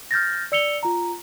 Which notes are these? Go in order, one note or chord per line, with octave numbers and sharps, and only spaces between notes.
F6 G6 A6 A#6
D5 E6 C#7 F7 G7
F4 A#5